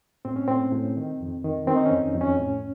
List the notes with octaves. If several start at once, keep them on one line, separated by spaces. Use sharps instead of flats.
A2 C4
C#4
A2 C4
A2
D#3
F2
D#3
D#3 C4
D#4
C#4
F2
F2
C#4
A2